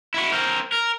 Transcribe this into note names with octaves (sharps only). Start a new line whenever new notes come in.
E4 F#4
C4 A#4
A#4